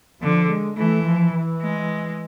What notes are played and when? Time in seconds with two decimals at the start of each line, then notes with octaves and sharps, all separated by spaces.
0.21 D3 F3
0.49 G#3
0.77 E3 A3
1.05 F3
1.33 E3
1.61 G#3